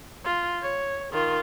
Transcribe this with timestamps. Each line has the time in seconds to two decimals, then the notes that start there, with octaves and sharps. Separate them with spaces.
0.24 F4
0.62 C#5
1.12 D#3 F4